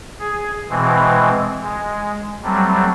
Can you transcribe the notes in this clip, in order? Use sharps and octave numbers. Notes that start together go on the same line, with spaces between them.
G#4
B2 E3 G#3 C4
G#3
F#3 G3 A3 C4